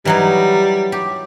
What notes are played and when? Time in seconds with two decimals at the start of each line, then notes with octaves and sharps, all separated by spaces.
0.05 E3 F#3 G3 D#4
0.92 G4